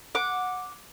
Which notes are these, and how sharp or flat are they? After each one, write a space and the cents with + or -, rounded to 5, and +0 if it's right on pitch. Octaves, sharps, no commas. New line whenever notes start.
F#5 -15 D6 +0